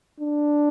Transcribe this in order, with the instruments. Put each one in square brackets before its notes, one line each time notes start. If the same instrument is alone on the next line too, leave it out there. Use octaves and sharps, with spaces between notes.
[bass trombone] D4